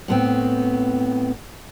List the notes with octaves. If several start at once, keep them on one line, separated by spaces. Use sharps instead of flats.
A2 B3 C4